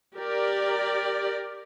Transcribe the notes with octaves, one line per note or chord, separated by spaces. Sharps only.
G4 A#4 D5